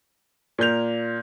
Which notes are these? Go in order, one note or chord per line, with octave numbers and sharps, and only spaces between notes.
A#2 A#4 G6 F7